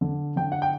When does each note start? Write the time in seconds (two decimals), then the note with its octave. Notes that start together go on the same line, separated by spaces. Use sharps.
0.01 D3
0.36 D3 G5
0.52 F#5
0.62 G5